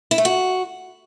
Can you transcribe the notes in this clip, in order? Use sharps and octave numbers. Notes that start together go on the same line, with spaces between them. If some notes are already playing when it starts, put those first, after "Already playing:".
E4
A3
F#4